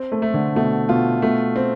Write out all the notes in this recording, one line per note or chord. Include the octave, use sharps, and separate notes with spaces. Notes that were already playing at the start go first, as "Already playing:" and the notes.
Already playing: C4
A3
A3
D3
B2 A3
B2 F4
B2 A3
C4